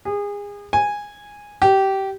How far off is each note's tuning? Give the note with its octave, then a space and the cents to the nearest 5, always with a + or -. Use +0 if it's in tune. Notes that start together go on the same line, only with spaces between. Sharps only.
G#4 -30
G#5 -10
G4 -20